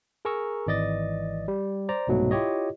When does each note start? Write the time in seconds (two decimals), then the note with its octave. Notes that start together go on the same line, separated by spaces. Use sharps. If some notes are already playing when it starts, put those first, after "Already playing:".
0.25 G#4 A#4 G#5 A#5 C#6 E6
0.67 G#1 E3 D5 D#5 A6
1.48 G3
1.89 C5 D5 A#5
2.07 C2 G#2 B2 F#3 A3
2.31 E4 F4 G4 C#5 D#5